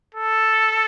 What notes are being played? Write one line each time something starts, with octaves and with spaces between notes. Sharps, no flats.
A4